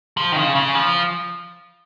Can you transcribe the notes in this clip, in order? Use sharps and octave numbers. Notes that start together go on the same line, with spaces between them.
F3
D#3
C#3
C#3
F3